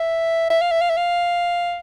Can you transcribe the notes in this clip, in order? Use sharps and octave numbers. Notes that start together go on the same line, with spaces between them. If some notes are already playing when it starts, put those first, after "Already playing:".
Already playing: E5
E5
F5
E5
F5
E5
F5